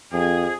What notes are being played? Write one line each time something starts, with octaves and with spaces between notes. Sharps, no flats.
F2 G#4